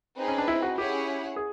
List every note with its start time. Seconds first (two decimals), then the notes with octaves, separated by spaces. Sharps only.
0.19 C4 D#4 G#4 B4
0.28 C#4
0.38 D4
0.48 E4
0.62 F#4
0.78 C#4 E4 G4 G#4 C#5 F#5
1.36 G#4